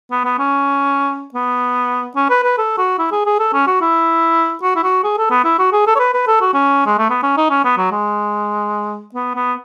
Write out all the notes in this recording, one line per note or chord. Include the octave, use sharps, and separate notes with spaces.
B3
B3
C#4
B3
C#4
B4
B4
A4
F#4
E4
G#4
G#4
A4
C#4
F#4
E4
F#4
E4
F#4
G#4
A4
B3
E4
F#4
G#4
A4
C#5
B4
B4
A4
F#4
C#4
G#3
A3
B3
C#4
D#4
C#4
B3
F#3
G#3
B3
B3